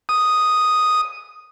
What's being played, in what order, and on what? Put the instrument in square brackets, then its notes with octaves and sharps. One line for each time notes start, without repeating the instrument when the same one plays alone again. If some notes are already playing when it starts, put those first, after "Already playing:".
[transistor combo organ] D#6